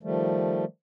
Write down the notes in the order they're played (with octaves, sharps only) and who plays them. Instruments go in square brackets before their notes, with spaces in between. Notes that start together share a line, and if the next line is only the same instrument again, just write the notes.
[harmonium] D#3 F3 G3 A3